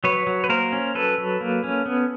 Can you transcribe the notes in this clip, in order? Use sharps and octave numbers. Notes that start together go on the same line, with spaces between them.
F#3 B4 C#5
F#3
B4
A#3 A#4 C5
C#4
F#3 A4 B4
F#3
A#3
C#4
B3